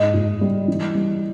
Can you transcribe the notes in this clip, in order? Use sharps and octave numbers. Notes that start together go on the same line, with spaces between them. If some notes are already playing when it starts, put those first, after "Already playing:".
Already playing: G#2 D#5
G#2
G3
E3
G3